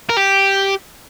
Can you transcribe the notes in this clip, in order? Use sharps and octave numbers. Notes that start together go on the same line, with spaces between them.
A#4
G4